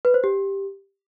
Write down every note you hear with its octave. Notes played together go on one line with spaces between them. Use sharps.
B4
C5
G4